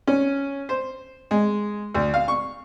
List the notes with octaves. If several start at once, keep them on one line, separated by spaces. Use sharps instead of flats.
C#4
C5
G#3
D2
F5
C#6